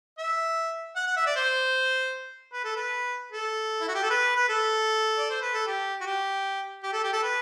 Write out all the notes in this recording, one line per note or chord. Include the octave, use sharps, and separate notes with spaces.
E5
F#5
F#5
E5
D5
C5
B4
A4
B4
A4
E4
F#4
G4
A4
B4
B4
A4
D5
C5
B4
A4
G4
F#4
G4
G4
A4
G4
A4
B4